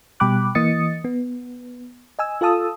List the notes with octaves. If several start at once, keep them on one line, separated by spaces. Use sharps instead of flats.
B2 G3 G5 B5 D6 F#6
E3 A#3 D#5 D#6 A6 C#7
B3
D#5 G#5 E6
F4 A4 F5 A5 D#6 E6